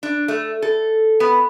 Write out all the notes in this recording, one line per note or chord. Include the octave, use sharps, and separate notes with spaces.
D4
A3
A4
B3